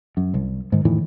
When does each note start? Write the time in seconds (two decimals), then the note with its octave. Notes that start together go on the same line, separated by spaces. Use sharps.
0.17 F#2
0.34 C2
0.72 G#2 D#3
0.85 F2 A2 D#3 E3